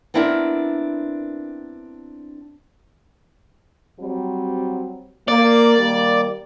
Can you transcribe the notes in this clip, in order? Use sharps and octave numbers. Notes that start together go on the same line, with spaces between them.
B3 C4 D4 E4 F#4 A#4
F#3 G3 C4
A#3 D5
D#3 G3 A#3